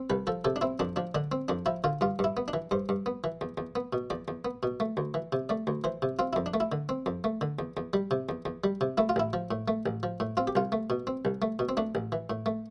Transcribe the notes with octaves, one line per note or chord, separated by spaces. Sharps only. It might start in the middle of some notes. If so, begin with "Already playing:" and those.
Already playing: C4
C2 B4
F3 A4
C3 A4
D4
C4 E4
F2 D4
F3 D4
D3 D4
C4
F2 D4
F3 E4
D3 F4
G2 F4
G2 E4
B3
D4
E3
G2 C5
G2
B3
E3
E2
E2
B3
B2
E2 D5
E2
B3
B2
A3
D2
E3
C3
A3 D5
D2
E3 C5
C3
C4 F4
F2 E4
D4
A3
E4
D3
C4
F2
A3
D3
E2
E2
G3
C3
E2
E2
G3
C3
A3 E4
F4
A1 E4
F3
A2
A3
A1
F3
A2
C4 F4
G4
C2 F4
A3
B2
C4
C2
A3
B2
C4
A3 D4
A1
E3
A2
A3